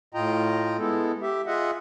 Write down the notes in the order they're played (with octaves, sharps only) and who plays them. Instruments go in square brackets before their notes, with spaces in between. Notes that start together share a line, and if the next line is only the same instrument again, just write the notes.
[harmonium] A2 F4 D#5 G5 A#5
G#3 B3 E4 A4
G4 E5
F4 G#4 D#5 E5 F#5